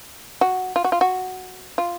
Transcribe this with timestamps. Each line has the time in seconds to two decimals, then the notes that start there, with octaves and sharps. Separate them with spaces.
0.41 F#4
0.76 F4
0.84 F#4
0.92 F4
1.01 F#4
1.78 F4